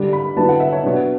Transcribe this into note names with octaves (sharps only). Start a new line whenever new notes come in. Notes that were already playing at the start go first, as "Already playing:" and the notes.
Already playing: D3 G3 D4
B5
D3 F#3 B3 E4 A5
F#5
E5
C#5
B2 F#3 B3 D4